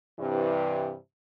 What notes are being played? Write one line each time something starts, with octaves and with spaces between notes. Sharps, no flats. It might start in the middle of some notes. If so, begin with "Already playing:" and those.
G2 C3 E3